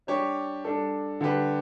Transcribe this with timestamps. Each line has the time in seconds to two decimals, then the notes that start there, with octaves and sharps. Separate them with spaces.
0.07 G3 D4 G4 C#5
0.64 G3 D4 A4
1.20 D3 G3 D4 G4 B4